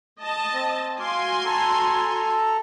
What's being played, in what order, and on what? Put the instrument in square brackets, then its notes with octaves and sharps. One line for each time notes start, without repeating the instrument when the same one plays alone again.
[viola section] D#5 A5
[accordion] C4
[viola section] F#4 G#5 C6 [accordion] F5 D6
[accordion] A4 A#5